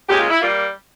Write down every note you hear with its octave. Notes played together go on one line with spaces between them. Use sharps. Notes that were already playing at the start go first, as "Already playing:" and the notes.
A#2 G#3 C#4 G4
F4
E4
G3 A#3 F4